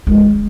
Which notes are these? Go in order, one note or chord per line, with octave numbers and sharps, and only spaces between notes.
G#3